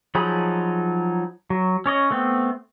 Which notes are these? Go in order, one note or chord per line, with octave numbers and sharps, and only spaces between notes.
F3 F#3 D#4 G#4 B5
F#3
C#4 C#5 D#5
A3 B3 C4